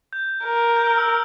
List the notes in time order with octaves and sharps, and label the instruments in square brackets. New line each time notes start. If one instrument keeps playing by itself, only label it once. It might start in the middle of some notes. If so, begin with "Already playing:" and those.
[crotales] G6
[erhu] A#4
[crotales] G6
F6
E6